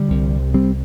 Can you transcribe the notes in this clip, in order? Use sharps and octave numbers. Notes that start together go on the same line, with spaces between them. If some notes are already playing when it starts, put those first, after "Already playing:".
Already playing: D3 G3
C2 C3
G3 C4